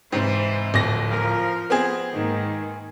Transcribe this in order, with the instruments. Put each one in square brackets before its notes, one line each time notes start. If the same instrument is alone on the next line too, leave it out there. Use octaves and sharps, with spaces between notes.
[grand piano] G#2 C3 [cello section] E3 C5
[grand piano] D1 F2 A#6
[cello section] F3 A#4
[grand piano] B3 C4 G#4
[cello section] G#2 D#3 A#3